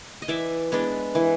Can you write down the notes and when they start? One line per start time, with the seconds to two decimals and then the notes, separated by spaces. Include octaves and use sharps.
0.22 D#5
0.28 E3 D5 E5
0.72 G#3 B3 D4
1.15 E3